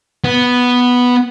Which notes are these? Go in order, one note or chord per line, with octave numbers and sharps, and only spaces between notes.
B3